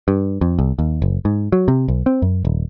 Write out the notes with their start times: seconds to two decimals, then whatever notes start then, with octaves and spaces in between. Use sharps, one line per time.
0.08 G2
0.41 F2
0.59 C2
0.79 D#2
1.02 F#1
1.25 G#2
1.52 F#3
1.68 C3
1.88 B1
2.06 C4
2.22 F#2
2.45 D#1